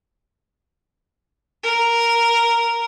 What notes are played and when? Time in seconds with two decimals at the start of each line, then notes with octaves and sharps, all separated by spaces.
1.63 A#4